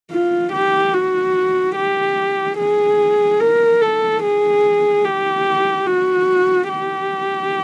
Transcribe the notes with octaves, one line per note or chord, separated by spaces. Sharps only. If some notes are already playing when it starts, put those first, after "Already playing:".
F4
G4
F#4
G4
G#4
A#4
A4
G#4
G4
F#4
G4